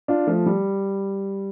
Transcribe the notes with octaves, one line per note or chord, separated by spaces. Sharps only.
D4 F4
F3 A3
G3